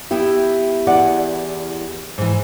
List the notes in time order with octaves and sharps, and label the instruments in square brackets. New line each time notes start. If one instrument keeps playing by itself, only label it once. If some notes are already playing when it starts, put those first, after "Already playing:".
[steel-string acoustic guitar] B3 E4 G4
[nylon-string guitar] E2 D5 F#5
[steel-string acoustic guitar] G#2 E3